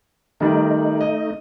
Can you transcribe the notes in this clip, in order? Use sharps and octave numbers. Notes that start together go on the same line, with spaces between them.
D#3 G3 A3 D#4
D#5